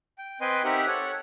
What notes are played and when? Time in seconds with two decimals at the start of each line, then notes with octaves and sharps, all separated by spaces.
0.18 G5
0.41 C4 B4 D#5 G5 G#5 C6
0.64 C4 D#4 G4 A#4 E5 F#5
0.87 A4 C#5 F#5